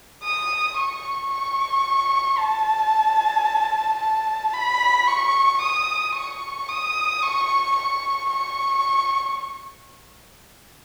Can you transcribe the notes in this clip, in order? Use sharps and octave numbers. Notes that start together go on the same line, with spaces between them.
D#6
C#6
C#6
A5
A5
B5
C#6
D#6
C#6
D#6
C#6
C#6
C#6